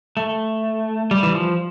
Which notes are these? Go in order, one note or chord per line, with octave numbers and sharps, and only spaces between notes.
A3
G3
E3
F3